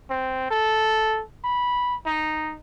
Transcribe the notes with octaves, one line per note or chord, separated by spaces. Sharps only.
C4
A4
B5
D#4